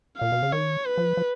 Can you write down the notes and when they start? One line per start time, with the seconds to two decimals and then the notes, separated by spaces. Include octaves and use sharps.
0.18 A#2 F5
0.32 B2
0.42 C#3
0.53 D#3 C#5
0.87 B4
0.98 F3
1.17 F3